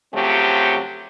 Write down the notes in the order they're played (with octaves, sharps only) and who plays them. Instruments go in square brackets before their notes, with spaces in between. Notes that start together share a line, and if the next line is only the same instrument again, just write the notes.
[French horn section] C#3 F3 F#3 A3 C4 G4